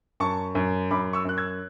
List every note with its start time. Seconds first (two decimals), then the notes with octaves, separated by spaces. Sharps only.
0.20 F#2 A5 C#6
0.55 F#2
0.91 F#2 B5 D6
1.13 C#6 E6
1.25 F#2 F#6
1.37 E6 G#6